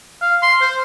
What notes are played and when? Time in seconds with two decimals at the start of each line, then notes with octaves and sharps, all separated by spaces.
0.21 F5
0.42 C6
0.61 C5